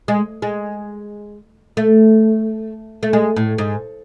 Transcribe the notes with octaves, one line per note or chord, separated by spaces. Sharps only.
G#3
G#3
A3
A3
G#3
A2
G#2